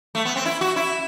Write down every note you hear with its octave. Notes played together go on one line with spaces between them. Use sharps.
A3
B3
C4
E4
F#4
E4